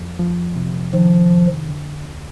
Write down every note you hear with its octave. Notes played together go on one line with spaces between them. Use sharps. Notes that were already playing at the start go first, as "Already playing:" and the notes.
Already playing: F2
F3
C3
D#3 F3
F2
D3
D2